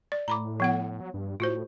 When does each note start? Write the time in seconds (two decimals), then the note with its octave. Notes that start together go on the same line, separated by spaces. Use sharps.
0.12 D5
0.28 A2 A#5 B5 D6
0.60 F3 B3 F#5
1.00 F#3
1.14 G2
1.40 A2 F4 F#4 C5